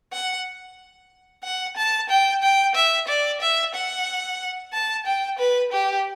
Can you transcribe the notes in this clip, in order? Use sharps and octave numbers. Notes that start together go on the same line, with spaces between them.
F#5
F#5
A5
G5
G5
E5
D5
E5
F#5
A5
G5
B4
G4